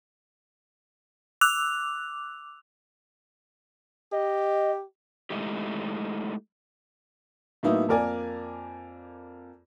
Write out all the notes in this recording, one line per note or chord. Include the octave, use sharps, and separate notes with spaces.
D6 E6 F#6 F7
G4 D#5
G#3 A3 D#4 E4 G4
A2 F#3 A#3 B3 D#4 E4
F2 A#3 A#4 D5 G#5